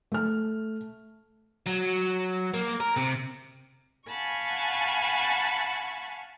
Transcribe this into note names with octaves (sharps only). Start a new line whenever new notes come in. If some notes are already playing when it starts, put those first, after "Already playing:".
A3 F6
F#3
A#3
A#4
C3
F5 F#5 G#5 A5 B5 C#6